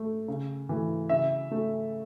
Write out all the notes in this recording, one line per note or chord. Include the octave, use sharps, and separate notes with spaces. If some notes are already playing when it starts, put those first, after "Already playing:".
Already playing: A3
C#3
E3 A3
C#3 E5
A3